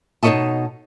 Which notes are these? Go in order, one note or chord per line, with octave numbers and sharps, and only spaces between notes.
B2 D#4 A#4 C#5 D#5 A5